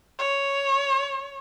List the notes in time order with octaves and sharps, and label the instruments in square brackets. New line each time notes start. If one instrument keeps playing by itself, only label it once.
[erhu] C#5